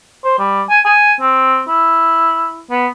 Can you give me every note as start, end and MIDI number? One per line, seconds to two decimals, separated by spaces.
0.24 0.37 72
0.39 0.62 55
0.70 0.80 80
0.85 1.13 80
1.21 1.63 60
1.68 2.62 64
2.70 2.87 59